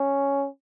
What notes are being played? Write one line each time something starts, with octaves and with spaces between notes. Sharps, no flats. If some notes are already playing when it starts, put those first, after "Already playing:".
Already playing: C#4